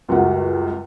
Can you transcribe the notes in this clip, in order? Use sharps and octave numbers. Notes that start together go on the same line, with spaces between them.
C#2 F#2 G3 F#5